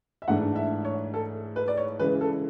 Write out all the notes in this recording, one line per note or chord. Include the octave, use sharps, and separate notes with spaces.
E5
G#2 E3 A3 D4 F#5
E5
C#5
A4
B4
D5
C#5
C#3 E3 G#3 B4
A4